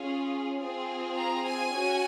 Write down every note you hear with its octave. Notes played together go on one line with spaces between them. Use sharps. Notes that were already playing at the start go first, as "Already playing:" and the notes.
Already playing: C#4 F4 G#4
C4 F4 G#4
A#5
G#5
C#4 F#4